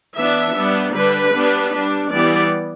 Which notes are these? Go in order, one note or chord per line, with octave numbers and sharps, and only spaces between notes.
E3 B3 D4 E5
G3 B3 D4
D3 G3 D4 B4
G3 B3 D4
G3 D4
E3 G3 B3 D5